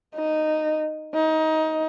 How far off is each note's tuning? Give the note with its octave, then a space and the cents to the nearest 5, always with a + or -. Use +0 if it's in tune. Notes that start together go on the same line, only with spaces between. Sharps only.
D#4 -10
D#4 +20